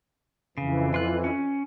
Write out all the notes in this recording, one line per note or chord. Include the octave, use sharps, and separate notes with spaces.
F2 C#3 E3
F4 F#6
C#4